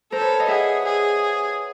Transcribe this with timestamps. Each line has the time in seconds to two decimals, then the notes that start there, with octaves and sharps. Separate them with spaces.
0.12 A4 A#4 C5
0.21 B4 C#5
0.39 D#5 F5
0.48 G#4 E5 F#5
0.85 G#4